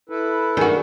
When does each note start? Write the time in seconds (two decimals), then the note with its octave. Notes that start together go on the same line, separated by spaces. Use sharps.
0.09 E4 A4 B4
0.57 D#3 D4 F#4 G#4 A#4